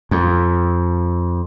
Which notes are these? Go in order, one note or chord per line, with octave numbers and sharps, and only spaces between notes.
F2